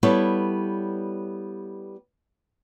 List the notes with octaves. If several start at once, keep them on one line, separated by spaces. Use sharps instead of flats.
G3 B3 E4 A4 C#5